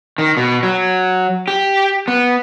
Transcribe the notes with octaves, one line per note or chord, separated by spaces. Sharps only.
D#3
B2
F#3
G4
B3